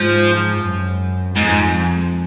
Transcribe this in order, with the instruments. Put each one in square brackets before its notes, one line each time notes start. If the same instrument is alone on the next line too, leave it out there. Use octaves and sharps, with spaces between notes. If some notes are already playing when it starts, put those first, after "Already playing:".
Already playing: [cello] G#2 [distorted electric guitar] F3
[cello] F#2
[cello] F2 [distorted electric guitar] G#2